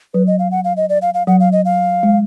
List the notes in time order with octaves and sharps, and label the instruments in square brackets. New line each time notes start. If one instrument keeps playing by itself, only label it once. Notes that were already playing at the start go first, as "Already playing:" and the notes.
[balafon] F#3 [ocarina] B4
[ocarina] D#5
F5
F#5
F5
D#5
D5
F5
F5
[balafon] F#3 [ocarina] F#5
[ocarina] F5
D#5
F5
[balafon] G#3